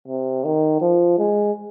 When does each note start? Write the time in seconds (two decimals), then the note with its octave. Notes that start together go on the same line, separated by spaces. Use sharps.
0.08 C3
0.45 D#3
0.81 F3
1.18 G#3